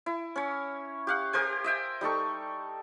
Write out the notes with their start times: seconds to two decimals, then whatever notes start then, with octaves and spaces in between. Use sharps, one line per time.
0.06 E4
0.36 C#4 C#5
1.07 G4 F5 F#5
1.33 G4 A#4 C5 G#5
1.64 D#5 E5 G5 G#5
2.01 G3 D#4 A4 C#6